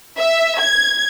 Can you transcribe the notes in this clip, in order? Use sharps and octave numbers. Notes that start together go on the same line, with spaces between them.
E5
G#6